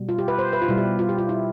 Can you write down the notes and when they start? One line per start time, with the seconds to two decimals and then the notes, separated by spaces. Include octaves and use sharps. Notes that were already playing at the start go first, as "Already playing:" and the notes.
Already playing: B2 G3
0.09 F4
0.18 G4
0.28 B4
0.39 C5
0.53 B4
0.62 F4
0.68 B2 G3 E4
0.78 G4
0.99 F4
1.09 G4
1.18 F4
1.29 E4